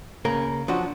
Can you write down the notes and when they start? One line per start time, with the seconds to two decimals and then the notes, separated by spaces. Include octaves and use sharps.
0.25 C#3 A#3 A#4
0.68 F3 F#3 D4 F#4